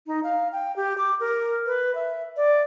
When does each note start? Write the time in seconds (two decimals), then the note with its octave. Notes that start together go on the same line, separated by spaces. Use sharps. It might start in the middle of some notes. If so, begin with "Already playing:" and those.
0.07 D#4
0.24 F5
0.52 G5
0.76 G4
0.98 D6
1.20 A#4
1.66 B4
1.95 E5
2.37 D5